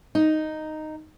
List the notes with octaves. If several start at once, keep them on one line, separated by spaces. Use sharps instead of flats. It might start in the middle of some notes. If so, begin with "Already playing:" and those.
D#4